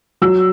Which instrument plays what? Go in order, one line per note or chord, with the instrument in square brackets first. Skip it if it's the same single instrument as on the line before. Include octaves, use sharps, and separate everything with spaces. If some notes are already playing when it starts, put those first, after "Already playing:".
[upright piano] F#3 E6